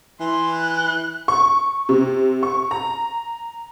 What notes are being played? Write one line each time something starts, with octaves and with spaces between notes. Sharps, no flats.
E3 C6
F#6
C#6
C3
C#6
A#5